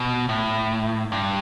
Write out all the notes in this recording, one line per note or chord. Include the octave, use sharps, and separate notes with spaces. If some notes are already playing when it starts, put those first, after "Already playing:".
Already playing: B2
A2
G2